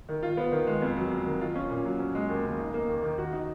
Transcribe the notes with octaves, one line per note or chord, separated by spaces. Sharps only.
D#3
F4
B3
D#3
G#3
F2
F#3
F2
D#3
F4
C#4
A#2
F#3
C#4
G#3
D#2
C#3
D#4
A#3
D#2
D#3
F#4
D#4